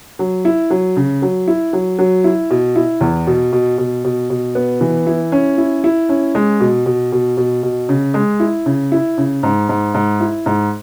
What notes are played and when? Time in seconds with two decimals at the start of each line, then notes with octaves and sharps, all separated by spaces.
0.19 F#3
0.45 E4
0.70 F#3
0.96 C#3
1.22 F#3
1.48 E4
1.73 F#3
1.99 F#3
2.24 E4
2.50 B2
2.76 E4
3.01 E2
3.27 B2
3.53 B2
3.78 B2
4.05 B2
4.30 B2
4.55 B3
4.81 E3
5.07 E4
5.32 C#4
5.58 E4
5.84 E4
6.09 C#4
6.35 G#3
6.60 B2
6.86 B2
7.12 B2
7.37 B2
7.63 B2
7.89 C#3
8.14 G#3
8.40 E4
8.66 C#3
8.92 E4
9.18 C#3
9.43 G#2
9.69 G#2
9.94 G#2
10.20 E4
10.46 G#2